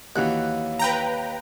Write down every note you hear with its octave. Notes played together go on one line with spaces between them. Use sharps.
D#2 E3 F#4 C#5 F5 F#6
B4 G5 A#5